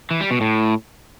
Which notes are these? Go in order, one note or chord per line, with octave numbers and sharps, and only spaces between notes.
E3
G3
B2
A2